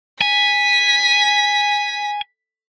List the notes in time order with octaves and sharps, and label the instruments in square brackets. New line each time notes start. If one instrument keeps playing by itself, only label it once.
[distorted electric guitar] G#5 [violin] B6